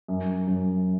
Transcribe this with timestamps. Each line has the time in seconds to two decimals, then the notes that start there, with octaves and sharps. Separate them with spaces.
0.08 F#2
0.47 F#2